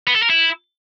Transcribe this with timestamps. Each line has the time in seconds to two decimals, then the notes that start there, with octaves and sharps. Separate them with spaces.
0.07 B3
0.15 A4
0.22 A#4
0.30 E4